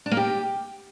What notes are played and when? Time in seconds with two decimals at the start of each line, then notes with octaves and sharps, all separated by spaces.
0.06 D4
0.11 A#3
0.17 G4